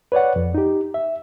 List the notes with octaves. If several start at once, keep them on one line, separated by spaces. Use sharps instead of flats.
B4 C#5 D5 F#5
F2
D#4 G4
E5